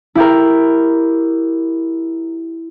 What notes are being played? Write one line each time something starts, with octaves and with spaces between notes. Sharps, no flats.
E4 G4 A#4